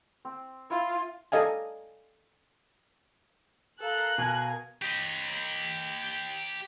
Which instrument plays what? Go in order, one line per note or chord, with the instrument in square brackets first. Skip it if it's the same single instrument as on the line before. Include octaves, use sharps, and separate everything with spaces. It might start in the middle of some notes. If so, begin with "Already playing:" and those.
[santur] C4
[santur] E4 [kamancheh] F4
[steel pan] G4 A4 D#5 F5 G#5
[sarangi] A4 [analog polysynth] A#4 F5 A#5 [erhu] F#6
[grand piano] B2 [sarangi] G#5
[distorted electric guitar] G4 D#5